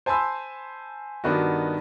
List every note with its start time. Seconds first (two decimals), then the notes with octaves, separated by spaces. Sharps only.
0.06 C5 G#5 A5 B5 C6 E6
1.24 G2 D#3 B3 D#4 F#4